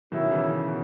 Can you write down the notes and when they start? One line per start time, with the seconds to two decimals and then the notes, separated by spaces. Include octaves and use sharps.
0.12 B2 D#3 F#3 C#4 E4
0.31 C#3 E3
0.50 C#3
0.68 B2